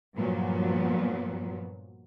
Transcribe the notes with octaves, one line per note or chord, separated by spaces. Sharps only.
G2 A#2 F3 F#3 B3